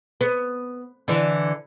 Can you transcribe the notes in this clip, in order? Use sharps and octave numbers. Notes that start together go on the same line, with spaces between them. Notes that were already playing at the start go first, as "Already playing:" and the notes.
B3
D3 E3